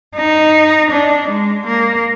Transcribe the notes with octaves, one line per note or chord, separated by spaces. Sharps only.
D#4
D4
G#3
A#3